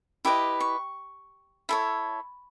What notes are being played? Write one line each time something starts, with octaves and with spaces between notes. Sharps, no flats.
E4 G4 B4 D#5 D6
C#6
E4 A4 C#5